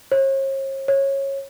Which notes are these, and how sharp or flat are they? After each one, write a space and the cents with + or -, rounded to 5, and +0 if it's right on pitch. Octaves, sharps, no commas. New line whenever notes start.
C#5 -45
C#5 -20